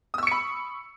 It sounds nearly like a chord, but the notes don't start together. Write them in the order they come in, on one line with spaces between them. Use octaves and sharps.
D#6 E6 C#6 C#7 B5